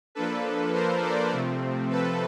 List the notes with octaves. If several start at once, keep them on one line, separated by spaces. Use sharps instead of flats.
F3 A#3 D4 A4 B4
A#4 C5
C5 D5
C3 F3 A3 C4
A4 B4